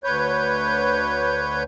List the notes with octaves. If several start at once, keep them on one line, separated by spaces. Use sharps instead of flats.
D2 B4 C#5 G6